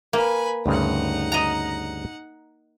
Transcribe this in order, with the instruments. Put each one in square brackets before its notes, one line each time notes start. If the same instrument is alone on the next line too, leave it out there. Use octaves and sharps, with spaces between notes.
[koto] A#3 [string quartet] B4 G#5 B5
[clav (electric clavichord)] D2 G2 C#3 [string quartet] D#4 F#5
[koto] D#5 A#5